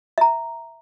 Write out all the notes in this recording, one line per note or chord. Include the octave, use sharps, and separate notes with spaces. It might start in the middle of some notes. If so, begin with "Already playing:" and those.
E5 A#5